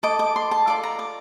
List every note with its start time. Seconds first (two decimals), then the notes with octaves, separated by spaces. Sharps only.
0.03 A4 D#5 D6
0.19 D6
0.36 C6
0.51 A5
0.67 F4 A4 D5 D6
0.83 A#5
0.99 D6